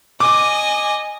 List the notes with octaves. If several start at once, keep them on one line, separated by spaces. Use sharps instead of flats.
D#5 G#5 D6